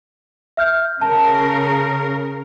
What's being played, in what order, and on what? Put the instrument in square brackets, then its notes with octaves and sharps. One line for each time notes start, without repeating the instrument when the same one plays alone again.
[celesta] E5 F6 G6
[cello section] C#3 A#4 [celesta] A5